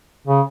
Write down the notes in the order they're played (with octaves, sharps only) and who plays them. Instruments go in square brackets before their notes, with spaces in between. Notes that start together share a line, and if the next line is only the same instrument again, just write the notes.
[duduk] C#3